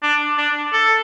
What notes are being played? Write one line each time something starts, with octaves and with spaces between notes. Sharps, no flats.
D4
D4
A4